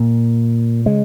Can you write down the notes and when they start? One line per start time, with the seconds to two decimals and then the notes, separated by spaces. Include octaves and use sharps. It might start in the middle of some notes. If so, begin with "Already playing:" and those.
Already playing: A#2 A#3
0.86 C#3 G#3